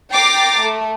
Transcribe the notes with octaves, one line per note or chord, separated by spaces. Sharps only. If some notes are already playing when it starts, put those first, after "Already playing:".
G5 A#5 D6 A6 C7
A3